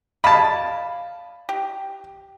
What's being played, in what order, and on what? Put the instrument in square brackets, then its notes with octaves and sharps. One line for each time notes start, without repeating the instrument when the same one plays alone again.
[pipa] D5 D#5 F5 [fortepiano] A5 B5
[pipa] G4